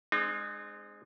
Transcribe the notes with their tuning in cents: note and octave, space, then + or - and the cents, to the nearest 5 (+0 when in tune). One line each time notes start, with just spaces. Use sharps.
G#3 +0 C4 +0 D#4 -45